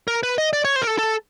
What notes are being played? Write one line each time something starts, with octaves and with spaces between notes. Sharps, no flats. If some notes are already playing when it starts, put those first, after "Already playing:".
A#4
B4
D#5
D5
C#5
C5
A#4
A4
A4